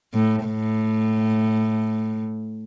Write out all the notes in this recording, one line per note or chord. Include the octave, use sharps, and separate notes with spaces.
A2
A2